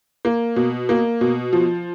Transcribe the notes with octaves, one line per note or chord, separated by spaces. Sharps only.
A#3
B2
A#3
B2
F3